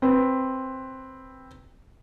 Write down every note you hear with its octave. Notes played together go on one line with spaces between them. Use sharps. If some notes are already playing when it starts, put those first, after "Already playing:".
C4 B4